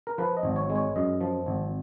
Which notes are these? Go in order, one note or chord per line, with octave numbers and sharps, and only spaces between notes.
A#4
F3 B4
D#5
G#1
C#5
G#3
C#5
F#2 D#5
F3
G#1